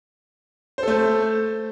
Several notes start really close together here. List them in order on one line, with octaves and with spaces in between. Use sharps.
C5 A4 A3